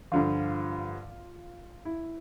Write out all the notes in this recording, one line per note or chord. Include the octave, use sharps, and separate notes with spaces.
G2 D3 F3 F4
E4